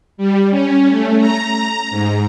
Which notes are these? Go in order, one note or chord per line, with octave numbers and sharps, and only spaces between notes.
G3
C#4
A3
A#5
G#2